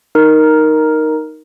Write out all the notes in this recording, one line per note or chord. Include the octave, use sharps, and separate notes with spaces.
D#4 A#4